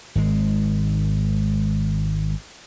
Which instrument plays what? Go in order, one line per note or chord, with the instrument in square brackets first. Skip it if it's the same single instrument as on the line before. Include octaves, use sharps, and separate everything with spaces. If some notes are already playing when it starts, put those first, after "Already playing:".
[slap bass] G#1 G#3